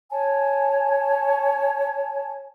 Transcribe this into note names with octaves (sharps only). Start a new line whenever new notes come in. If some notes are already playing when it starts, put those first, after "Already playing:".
C#5 G#5 A5